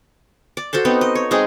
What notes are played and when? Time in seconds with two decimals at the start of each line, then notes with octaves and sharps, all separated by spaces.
0.57 D5
0.73 F#4 A4 C5 A5
0.85 B3 C4 D#4
1.01 D#5
1.15 C#5
1.31 G#3 C4 D#4 G#4